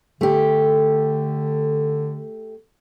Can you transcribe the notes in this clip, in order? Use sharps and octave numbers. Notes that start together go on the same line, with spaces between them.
D3 A3 G4